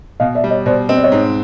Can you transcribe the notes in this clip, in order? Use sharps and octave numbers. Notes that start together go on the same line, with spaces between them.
B2 D#5 F5
D5 E5
G3
C#5 D#5
B2 C5 D5
C4 D#5
D5
C#5 D#5
G#2